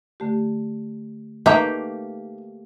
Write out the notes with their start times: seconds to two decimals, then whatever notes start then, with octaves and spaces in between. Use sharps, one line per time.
0.20 D3 A3 G4
1.46 A3 A#3 D#4 G4 B4 E5 A#5 F#6